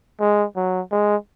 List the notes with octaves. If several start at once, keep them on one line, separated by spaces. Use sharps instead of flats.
G#3
F#3
G#3